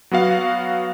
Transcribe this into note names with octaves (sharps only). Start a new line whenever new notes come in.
F#3 B3 F#4 F5